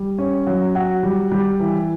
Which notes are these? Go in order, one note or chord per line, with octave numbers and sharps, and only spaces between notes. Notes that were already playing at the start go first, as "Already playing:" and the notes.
Already playing: G3
C#4
F#3
F#4
G3
G3
E3